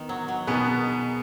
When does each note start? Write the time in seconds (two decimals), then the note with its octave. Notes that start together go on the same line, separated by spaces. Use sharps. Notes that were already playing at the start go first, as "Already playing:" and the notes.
Already playing: D#3 B3
0.09 F#3
0.28 F#3
0.47 B2 D#3 B3 G#4 B4